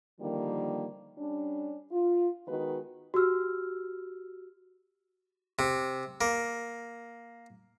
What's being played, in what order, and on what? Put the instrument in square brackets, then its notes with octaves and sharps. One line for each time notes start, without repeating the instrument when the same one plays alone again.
[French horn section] D3 D#3 F3 G3 A#3
G3 C#4 D4
F4
D#3 G#3 B3 F#4 B4
[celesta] F#4 G4 E6 F6
[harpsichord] C3
A#3